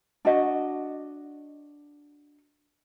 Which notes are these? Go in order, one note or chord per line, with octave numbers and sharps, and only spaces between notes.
D4 F#4 D#5